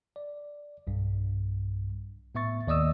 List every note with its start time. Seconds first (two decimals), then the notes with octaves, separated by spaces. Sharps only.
0.16 D5
0.87 B1 G2
2.35 A2 B3 E5 C#6 A6
2.67 D#2 D5 D#5 D#6 E6